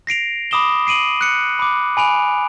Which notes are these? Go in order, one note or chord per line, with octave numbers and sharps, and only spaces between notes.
A#6 C7 D7 F7
B5 D6 D#6 E7 G7
C7 D7 D#7 F#7
F#6 C#7
B5 D6
G#5 B5 D7 F7